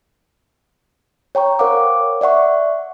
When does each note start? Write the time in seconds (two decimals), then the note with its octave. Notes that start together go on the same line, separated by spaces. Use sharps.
1.35 C#5 G5 A#5 C#6
1.59 A#4 C5 C#5 F5 F#5 D6
2.21 D5 E5 F#5 C#6